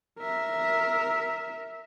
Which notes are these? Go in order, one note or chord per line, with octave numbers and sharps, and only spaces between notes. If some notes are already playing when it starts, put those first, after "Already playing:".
A#4 E5